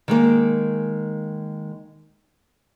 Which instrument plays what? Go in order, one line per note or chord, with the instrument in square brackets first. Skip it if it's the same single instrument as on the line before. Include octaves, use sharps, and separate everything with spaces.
[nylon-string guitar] D#3 G#3 A#3